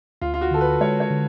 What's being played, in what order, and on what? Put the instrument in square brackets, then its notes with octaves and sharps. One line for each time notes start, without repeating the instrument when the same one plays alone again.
[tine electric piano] D2 [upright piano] F4
[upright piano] F4
F#4
[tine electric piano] D3 [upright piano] A4
[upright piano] B4
[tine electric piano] G#3 [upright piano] C#5
[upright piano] C#5
[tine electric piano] D3